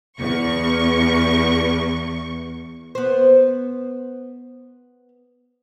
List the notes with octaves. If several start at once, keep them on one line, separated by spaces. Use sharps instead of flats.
E2 C#6
B3 C5